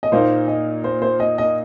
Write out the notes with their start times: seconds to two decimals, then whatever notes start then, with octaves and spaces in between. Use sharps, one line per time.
0.03 D#5
0.12 A#2 A#3 D#4 C5
0.48 D#5
0.84 C5
1.02 C5
1.20 D#5
1.38 D#5